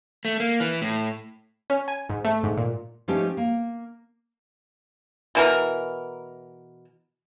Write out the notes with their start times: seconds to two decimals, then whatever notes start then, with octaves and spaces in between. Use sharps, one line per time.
0.25 A3
0.40 A#3
0.60 E3
0.82 A2
1.70 C#4
1.88 G#5
2.09 G#2
2.25 A3
2.43 G#2
2.57 A#2
3.08 F3 A3 C#4 D#4 G4
3.37 A#3
5.35 B2 E3 A#4